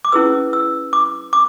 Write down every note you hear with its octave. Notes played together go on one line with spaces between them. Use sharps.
D6
C#4 E4 G#4 B4 E6
E6
D6
D6